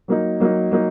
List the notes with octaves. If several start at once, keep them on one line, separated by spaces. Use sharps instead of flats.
F#3 A#3 D#4
F#3 A#3 D#4
F#3 A#3 D#4